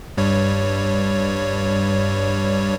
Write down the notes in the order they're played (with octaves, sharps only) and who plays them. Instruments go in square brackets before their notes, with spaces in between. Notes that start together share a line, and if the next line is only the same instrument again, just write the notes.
[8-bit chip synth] G2 G3 C#5